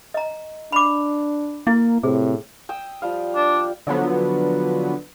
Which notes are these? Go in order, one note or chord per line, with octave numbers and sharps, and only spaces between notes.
D#5 A#5
D4 B5 D6
A#3 E4
A2 C3 G#4
G5 D#6 E6
F3 G3 F5
D4
D3 F3 F#3 B3